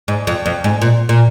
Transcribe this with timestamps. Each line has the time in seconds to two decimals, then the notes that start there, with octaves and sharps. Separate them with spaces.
0.08 G#2
0.27 F2
0.46 F2
0.64 G#2
0.82 A#2
1.09 A#2